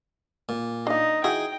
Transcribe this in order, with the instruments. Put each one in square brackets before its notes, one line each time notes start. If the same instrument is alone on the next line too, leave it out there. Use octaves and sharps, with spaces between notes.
[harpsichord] A#2
[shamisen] D4 F5 [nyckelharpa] D#4 D#5
[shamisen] E3 D#4 F#4 [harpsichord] G#4 [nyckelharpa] G5